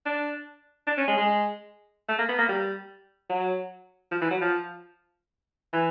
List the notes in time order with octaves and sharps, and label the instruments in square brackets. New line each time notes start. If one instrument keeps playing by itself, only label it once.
[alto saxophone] D4
D4
C#4
G#3
G#3
A3
A#3
B3
A#3
G3
F#3
F3
E3
F#3
F3
E3